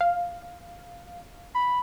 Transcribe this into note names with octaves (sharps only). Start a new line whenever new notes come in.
F5
B5